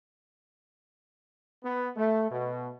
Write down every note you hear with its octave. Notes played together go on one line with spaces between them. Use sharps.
B3
A3
B2